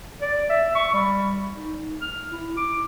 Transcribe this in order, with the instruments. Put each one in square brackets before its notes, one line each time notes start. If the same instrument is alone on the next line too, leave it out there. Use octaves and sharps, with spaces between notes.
[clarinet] D5
E5
C#6
G3
D#4
F6
E4
D6